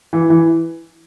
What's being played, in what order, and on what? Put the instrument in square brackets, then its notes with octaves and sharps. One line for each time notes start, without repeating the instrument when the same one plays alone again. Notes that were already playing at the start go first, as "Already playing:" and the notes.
[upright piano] E3
E3